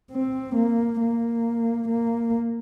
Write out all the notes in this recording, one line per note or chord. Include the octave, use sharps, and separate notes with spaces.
C4
A#3
A#3
A#3